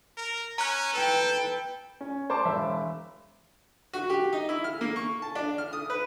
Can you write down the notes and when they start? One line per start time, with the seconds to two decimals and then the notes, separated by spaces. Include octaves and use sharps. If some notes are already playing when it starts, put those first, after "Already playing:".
0.18 A#4
0.58 C#4 A#5 F#6
0.94 A4 B4 G5
2.01 C#4
2.30 C5 A5 D6
2.45 E1 C5 E5
3.93 F#4
4.10 G4
4.33 D#4
4.49 E4
4.64 F6
4.81 A#3
4.96 C#6
5.22 A5
5.35 D4
5.58 F6
5.73 D#6
5.90 B4